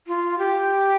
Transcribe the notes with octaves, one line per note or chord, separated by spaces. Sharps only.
F4
G4